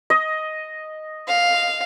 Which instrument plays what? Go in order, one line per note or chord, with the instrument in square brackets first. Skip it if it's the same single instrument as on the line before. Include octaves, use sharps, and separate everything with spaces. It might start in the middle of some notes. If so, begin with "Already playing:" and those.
[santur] D#5
[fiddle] F5